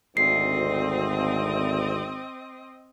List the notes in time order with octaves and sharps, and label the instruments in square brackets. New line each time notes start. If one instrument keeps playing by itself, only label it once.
[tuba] G#1 [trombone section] D2 [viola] C4 D#5 [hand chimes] C7